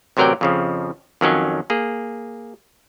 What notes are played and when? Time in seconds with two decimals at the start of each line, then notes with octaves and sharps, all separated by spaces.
0.17 A1 C3 F#3 A#4 D5 G5
0.41 F2 C#3 F3
1.21 F2 D#3 F#3 C#4
1.70 A#3 G#4